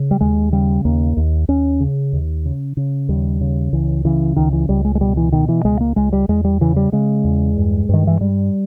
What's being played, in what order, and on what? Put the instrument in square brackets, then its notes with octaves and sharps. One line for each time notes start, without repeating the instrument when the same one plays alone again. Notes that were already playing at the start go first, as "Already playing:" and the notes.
Already playing: [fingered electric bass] C#3
G3
D#2 G#3
C#3 G3
D#2 A#3
D#2
D#2 C#4
C#3
D#2
C#3
C#3
D#2 G3
C#3
C#2 E3
C#3 E3
C#2 D#3
E3
C#2 G3
G#3
G#3
B2 G3
E3
B2 D#3
E3
C#2 G#3
A#3
C#2 G#3
G3
E2 G#3
G3
C#3 E3
G3
C#3 G#3
E2
G2
G2 D#3
E3
G2 G3